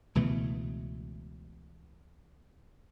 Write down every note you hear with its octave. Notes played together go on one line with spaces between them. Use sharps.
C#2 B2 E3 A3